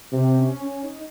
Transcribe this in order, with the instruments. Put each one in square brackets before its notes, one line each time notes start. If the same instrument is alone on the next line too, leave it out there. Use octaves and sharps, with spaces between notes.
[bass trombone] C3 [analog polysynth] C4
[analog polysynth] C#4
C#4
D#4